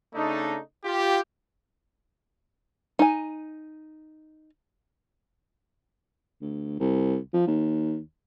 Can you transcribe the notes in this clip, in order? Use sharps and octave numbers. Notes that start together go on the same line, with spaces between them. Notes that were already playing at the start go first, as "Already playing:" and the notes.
C#3 A3 D4 D#4
F4 G4
D#4 G#5
D2
C2
F3
D#2